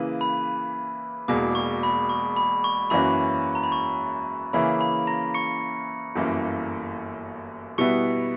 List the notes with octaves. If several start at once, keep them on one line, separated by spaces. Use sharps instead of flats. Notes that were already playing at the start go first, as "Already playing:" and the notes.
Already playing: C#3 E3 A#3 E4 B4
B5
E1 E2 B2 A#3 D6
C#6
B5
C#6
B5
C#6
F#2 E3 A#3 C#4 F#4 B5
A#5
B5
C#6
C#3 E3 A#3 C#4 E4 B5
B5
A#5 A#6
C#6 C#7
G1 F#2 E3 A#3
B2 G3 B3 E4 C#6 C#7